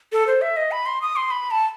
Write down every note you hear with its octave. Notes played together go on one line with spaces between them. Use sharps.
A4
C5
E5
D#5
B5
C6
D#6
C6
B5
A5